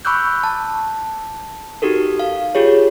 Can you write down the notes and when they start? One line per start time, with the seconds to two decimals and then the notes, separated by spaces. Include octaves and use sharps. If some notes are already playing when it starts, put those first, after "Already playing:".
0.05 B5 C#6 D6 E6 F#6 G6
0.43 A5
1.82 D#4 F#4 G4 A4 A#4
2.19 F5
2.55 F4 G4 G#4 C#5